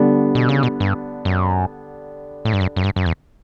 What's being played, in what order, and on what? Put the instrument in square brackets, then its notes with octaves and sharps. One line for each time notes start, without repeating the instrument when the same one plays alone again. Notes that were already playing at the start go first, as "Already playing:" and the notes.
Already playing: [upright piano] D3 G3 B3 D4
[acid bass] B2
C#3
B2
G2
F#2
A2
G2
F#2
F#2
G2
F#2
E2